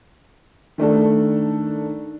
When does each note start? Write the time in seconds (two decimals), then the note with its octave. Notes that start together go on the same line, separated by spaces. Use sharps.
0.78 D#3 A3 D4 A4